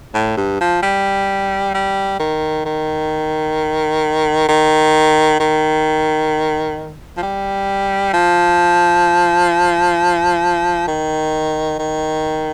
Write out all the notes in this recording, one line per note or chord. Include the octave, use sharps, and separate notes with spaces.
A2
G2
F3
G3
G3
D#3
D#3
D#3
D#3
F3
G3
F3
D#3
D#3